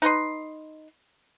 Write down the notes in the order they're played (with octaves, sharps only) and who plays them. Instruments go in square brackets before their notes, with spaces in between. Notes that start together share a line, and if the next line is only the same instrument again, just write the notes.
[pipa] D#4 B4 D#5 C6